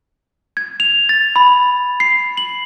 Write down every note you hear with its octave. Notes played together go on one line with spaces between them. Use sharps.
G#6
F7
A6
B5
C7
F#7